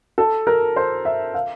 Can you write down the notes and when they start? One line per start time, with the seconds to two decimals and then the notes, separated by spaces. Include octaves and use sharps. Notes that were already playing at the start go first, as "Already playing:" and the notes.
0.18 A4
0.47 A#4
0.76 C5
1.05 E5
1.34 F5